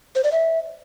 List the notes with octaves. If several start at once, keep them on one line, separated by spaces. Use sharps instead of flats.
C5
D5
E5